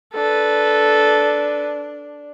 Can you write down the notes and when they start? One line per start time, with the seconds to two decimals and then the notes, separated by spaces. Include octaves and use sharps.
0.14 D4 A4 B4